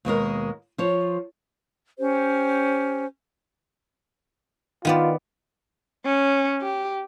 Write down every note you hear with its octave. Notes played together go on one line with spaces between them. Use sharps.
D#2 B2 G#3 A#4
F3 C5 C#5
C#4 G4 C5
D#3 B3 F4 D5
C#4
G4